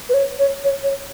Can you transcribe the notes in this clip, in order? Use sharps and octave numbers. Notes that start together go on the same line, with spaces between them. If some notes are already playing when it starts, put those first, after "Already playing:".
B4
C#5
C#5
C#5
C#5